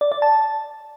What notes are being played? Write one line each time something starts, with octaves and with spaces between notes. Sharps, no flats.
D5
D5
A5